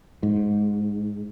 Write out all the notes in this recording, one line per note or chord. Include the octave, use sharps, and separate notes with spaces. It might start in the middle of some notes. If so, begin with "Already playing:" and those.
G#2